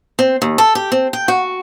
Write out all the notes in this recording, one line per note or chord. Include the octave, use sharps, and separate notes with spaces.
C4
D#2
A4
G4
C4
G5
F#4